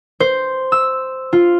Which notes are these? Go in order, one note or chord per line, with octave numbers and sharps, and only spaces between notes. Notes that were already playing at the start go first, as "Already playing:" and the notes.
C5
E6
F4